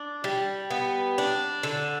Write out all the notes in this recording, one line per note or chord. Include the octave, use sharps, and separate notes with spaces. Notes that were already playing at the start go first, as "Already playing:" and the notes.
Already playing: D4
G3
B3
D4
D3